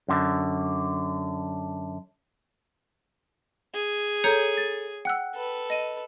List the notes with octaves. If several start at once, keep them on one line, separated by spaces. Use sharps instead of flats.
F#2 D3
G#4
A4 C#5 A#5 G6 C#7
A6
F#5 G5 E6 F#6
A4 B4
D#5 D#7